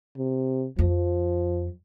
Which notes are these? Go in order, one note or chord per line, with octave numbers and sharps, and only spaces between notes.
C3
F2 F3